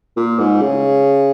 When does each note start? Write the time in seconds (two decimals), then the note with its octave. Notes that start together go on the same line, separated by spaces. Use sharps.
0.17 A#2
0.39 G#2
0.61 C#3